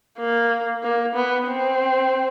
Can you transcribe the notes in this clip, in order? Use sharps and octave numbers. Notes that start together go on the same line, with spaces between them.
A#3
A#3
B3
C4